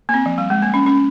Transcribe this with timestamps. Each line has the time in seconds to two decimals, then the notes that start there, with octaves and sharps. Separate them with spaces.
0.09 A#3
0.14 C4
0.26 F3
0.38 G3
0.50 G#3
0.62 A#3
0.74 C#4
0.86 C#4